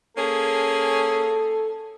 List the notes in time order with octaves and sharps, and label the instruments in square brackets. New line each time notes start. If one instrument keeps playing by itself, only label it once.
[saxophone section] A#3 C#4 G#4 [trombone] A4